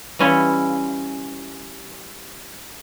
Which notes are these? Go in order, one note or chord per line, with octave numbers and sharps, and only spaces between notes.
E3 G3 C#4 E4 F4